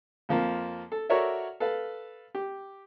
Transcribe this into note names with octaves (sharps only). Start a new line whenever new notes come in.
F2 F3 A#3
A4
F#4 A4 A#4 C#5 D5 E5
A4 B4 F5
G4